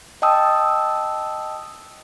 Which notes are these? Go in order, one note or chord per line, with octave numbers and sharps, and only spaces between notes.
D#5 G5 A5 D#6 E6